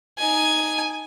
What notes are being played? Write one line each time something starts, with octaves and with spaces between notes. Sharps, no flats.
D#4 G#5